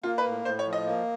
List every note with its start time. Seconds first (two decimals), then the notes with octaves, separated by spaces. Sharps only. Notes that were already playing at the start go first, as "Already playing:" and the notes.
0.03 A#3 F4
0.18 B4
0.25 A2
0.45 A2 C5
0.59 C#5
0.66 F3
0.73 D#5
0.86 A#3